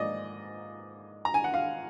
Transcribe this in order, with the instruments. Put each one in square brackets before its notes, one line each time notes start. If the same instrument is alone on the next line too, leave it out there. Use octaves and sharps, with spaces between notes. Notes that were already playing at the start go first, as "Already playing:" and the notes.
Already playing: [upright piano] G#2 F3 A#3 D5 D#5
A#5
G#5
F#5
F5